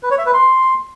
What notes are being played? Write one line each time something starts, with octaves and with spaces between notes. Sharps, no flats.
B4
C#5
E5
B4
C6